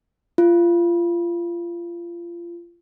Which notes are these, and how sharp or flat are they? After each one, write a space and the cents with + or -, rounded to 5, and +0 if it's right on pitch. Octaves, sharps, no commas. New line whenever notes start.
F4 -25